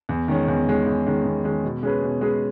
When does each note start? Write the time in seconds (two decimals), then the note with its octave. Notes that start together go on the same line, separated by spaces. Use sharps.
0.09 E2
0.28 D#3 G#3 C#4
0.48 E2
0.67 D#3 G#3 C#4
0.86 E2
1.06 D#3 G#3 C#4
1.25 E2
1.44 D#3 G#3 C#4
1.64 B2
1.83 G#3 C#4 G#4 B4
2.02 B2
2.21 G#3 C#4 G#4 B4